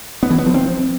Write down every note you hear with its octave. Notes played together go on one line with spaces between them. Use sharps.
B3
E3
B3
F3
C4